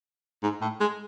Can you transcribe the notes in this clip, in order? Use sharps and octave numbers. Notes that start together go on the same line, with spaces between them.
G#2
A2
G#3